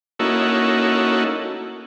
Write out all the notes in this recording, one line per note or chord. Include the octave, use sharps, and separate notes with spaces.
A#3 C#4 D#4 E4 F#4 A4